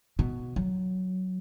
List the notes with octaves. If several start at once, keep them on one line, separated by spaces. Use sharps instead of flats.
B2
F#3